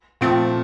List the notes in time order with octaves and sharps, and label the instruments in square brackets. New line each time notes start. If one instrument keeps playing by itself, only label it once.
[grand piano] A#2 F3 A3 [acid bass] C4